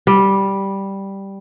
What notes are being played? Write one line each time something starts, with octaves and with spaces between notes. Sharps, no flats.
G3